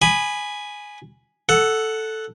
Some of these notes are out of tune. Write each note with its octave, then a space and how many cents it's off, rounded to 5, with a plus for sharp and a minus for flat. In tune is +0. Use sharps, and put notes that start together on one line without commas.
G#5 +0 B5 +0 D#6 -35
A4 +0 F#5 +0